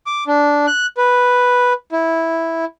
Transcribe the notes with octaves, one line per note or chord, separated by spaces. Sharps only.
D6
D4
F#6
B4
E4